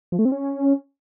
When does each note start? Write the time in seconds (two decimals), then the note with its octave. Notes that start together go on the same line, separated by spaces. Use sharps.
0.12 F3
0.19 A3
0.25 C4
0.32 C#4